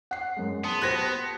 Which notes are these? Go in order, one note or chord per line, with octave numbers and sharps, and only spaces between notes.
F#5 C7
F#2 G#3
B3 A5 C6 D#6
F#4 G4 C5 F#6 G#6 A#6